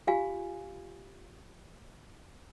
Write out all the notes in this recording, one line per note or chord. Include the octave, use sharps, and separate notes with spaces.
F4 G4 F5 G#5